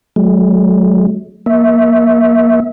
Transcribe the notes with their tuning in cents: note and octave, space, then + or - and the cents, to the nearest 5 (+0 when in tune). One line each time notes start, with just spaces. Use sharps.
F#3 +0 A3 -45
A#3 +20 E5 -20